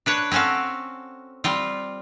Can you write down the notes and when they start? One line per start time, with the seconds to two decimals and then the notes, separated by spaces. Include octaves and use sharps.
0.06 D4 B4 C#5
0.31 C4 C#4 F#4 A4 F5
1.44 G3 C4 F4